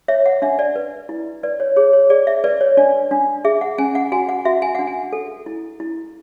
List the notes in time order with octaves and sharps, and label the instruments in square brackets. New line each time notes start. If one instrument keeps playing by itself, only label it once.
[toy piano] C#5 E5
F#5
D4 E5
D5
B4
E4
B4 D5
C#5
G#4 C#5
C#5
G#4 D5
E5
B4 D5
C#5
D4 D5
D4
G#4 E5
F#5
C#4 G#5
F#5
F#4 G#5
F#5
F#4 E5
G#5
D4 F#5
G#5
A4
E4
E4